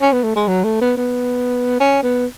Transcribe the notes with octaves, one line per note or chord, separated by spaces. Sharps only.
C#4
B3
A3
G#3
F#3
A3
B3
B3
C#4
B3